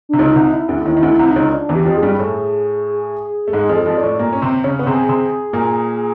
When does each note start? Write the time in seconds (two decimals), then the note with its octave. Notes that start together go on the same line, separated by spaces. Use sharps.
0.09 C3 D4
0.19 C#2 C#3 D#4
0.36 C2 C3
0.53 E4
0.69 D2 D3
0.81 D3
0.85 D#2 D#3 E4
0.97 D#3
1.02 D2 D3
1.08 E4
1.19 C2 C3
1.30 D#4
1.36 C#2 C#3
1.53 D4
1.69 E2 E3
1.75 G4
1.86 F2 F3
1.97 G#4
2.03 G2 G3
2.19 A2 A3
3.47 A3
3.53 G#2 G#3 G#4
3.69 F2 F3
3.76 A4
3.86 F2 F3
3.98 D5
4.03 A2 A3
4.19 A#2 A#3
4.33 C#4
4.42 C3 C4
4.64 C#3 C#4
4.79 B3
4.86 C3 C4 G#4
5.08 C3 C4
5.53 A#2 A#3